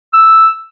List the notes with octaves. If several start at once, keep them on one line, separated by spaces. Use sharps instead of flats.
E6